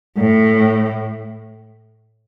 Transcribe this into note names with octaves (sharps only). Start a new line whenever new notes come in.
A2